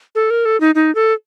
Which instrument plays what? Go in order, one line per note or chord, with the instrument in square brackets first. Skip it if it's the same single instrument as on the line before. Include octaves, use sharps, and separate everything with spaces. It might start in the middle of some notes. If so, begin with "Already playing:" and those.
[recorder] A4
A#4
A4
D#4
D#4
A4